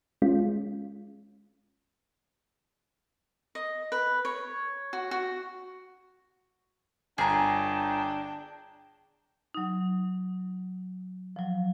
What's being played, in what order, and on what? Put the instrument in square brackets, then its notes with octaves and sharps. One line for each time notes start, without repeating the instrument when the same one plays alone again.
[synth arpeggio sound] G#3 C#4 F4
[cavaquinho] D#5
B4
C#5
F#4
F#4
[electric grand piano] G1 A#5 [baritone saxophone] D4 [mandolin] G#4 [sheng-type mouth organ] G5
[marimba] F#3 D#4
F3 F#3